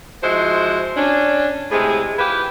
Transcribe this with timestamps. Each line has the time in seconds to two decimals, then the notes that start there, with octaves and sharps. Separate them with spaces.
0.24 F3 G#3 E4 F#4 C5
0.97 C#4 D4
1.71 A2 C3 G#3 G#4
2.19 E4 F4 G4 B4